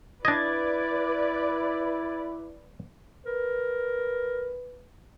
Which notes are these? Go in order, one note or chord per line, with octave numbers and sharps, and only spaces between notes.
D4 E4 B4 D5 D#5 G#6 A6
A#4 B4